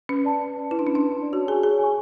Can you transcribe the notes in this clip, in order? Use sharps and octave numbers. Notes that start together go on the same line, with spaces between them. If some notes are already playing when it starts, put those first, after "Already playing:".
C#4 B4
D5 A5
B4
D5 A5
E4 B4
D4
C#4 D5 A5
D4
B4
A5
D5
F#4 C#5
G#4 G#5 C#6
G#4 C#5
G#5 C#6